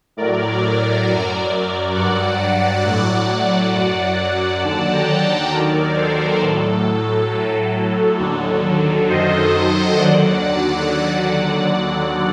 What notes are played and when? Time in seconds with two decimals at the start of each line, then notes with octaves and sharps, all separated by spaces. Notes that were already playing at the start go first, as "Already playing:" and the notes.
0.17 A2 F#3 A#4 D5
1.06 F#2 F#3
1.95 G2 F#3 D5 F#5
2.85 A2 F#3
3.74 F#2 F#3
4.62 D#2 D3 F#3 F#5 A5
4.92 G5 A#5
5.22 F#5 A5
5.51 D#2 D#3 F#3 A#4 D5
5.96 A4 C5
6.41 A2 F#3 A4
7.30 A2 F#3
8.19 D#2 D3 F#3
9.08 F#2 D#3 F#3 C5 D#5
9.97 D#2 D3 F#3 D5 F#5